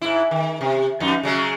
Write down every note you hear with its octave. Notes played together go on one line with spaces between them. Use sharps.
G#2 E4
D#3
C3
F2 D#4
C#3 F#3 G#3